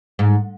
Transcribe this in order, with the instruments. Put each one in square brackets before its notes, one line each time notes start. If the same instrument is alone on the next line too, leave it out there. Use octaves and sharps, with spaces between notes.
[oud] G#2